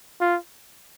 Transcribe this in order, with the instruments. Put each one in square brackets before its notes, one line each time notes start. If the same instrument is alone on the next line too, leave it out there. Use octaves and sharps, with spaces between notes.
[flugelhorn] F4